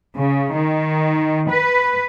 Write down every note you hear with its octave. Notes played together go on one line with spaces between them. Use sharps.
C#3
D#3
B4